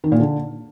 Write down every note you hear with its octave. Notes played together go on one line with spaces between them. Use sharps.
D#3
A#2
D3